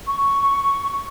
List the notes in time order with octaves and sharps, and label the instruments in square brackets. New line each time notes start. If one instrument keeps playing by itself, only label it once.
[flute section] C#6